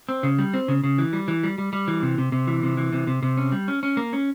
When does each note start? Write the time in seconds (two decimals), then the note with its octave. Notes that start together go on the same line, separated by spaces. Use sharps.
0.09 C4
0.23 C#3
0.39 G3
0.54 C4
0.68 C#3
0.84 C#3
0.98 E3
1.13 G3
1.28 E3
1.43 G3
1.58 G3
1.73 G3
1.88 E3
2.03 C3
2.18 C3
2.32 C3
2.47 E3
2.63 C3
2.77 E3
2.93 C3
3.07 C3
3.23 C3
3.37 C#4
3.52 G3
3.68 C#4
3.83 C#4
3.97 A#3
4.13 C#4